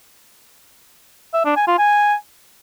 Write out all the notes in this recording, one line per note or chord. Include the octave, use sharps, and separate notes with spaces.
E5
D4
G#5
F4
G#5